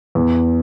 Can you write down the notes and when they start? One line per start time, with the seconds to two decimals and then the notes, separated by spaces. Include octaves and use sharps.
0.15 E2